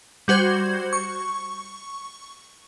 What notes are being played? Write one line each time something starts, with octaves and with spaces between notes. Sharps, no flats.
G3 F#4 C5 G#6
C#6